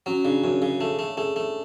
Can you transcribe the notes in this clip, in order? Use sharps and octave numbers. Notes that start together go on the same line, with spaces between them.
F#3 C#4
C#3 D4
F#2 C#4
C#3 G#4
A3 A4
A3
A3 G#4
A3